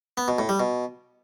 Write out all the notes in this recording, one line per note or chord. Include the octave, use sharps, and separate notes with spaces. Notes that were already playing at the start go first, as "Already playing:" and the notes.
B3
B2
A2
G3
B2